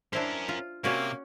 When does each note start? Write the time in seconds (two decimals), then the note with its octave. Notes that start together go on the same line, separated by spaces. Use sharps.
0.13 C#4 D4 E4 A#4 C5
0.48 F4
0.84 C3 A#3 C#4 F#4 D5